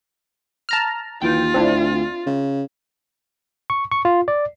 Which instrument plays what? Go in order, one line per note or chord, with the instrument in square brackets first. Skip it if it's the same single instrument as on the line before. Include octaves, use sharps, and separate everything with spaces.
[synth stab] A5 A#5 F6
[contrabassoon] D#2 [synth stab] E3 G5 [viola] F4
[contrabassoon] D2 [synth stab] C4 D4 E4
[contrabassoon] C#3
[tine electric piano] C#6
C#6
F4
D5